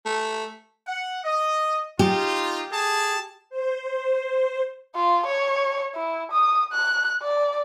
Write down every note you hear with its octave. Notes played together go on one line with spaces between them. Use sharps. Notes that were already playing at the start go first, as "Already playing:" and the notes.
A3
F#5
D#5
D#4 F4 G4
G#4 A4 A5
C5
F4
C#5
E4
D#6
F#6
D5